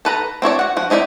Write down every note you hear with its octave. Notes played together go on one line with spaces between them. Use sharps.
A4 B4 A#5
C4 E4 C#5 D5
F#4 F#5
F3 F#4
C4 D#4 E4 C5 D5